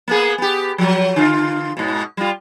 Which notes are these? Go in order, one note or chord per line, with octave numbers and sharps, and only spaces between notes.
A#3 B3 G#4
B3 G4
F3 F#3
D3 F4
G#2 B2
G3 F4